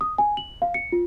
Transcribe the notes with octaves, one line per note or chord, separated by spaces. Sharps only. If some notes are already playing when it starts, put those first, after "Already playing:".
D#6
G#5
F#7
F5
C#7
F4